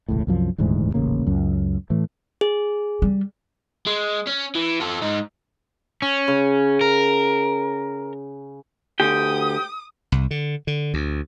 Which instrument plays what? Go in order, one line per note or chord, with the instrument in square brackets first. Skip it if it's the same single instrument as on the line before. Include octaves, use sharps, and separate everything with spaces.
[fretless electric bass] E1 C#2 A2
C2 F#2 F3
D#1 D2 G#2 E3
D#1 A1 C#3 A#3
C#2 F#2
A2 E3 A3
[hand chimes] G#4
[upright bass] G3
[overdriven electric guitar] G#3
C#4
E3
F4 A4
G#2 D#4
C#4
[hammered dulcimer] C#3
[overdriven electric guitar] A#4
[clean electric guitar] D2 G4 [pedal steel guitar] G5 [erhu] D#6
[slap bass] C2
D3
D3
D2